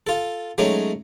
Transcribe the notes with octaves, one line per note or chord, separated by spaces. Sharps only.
F4 A4
F#3 G#3 A3 C#4 D#4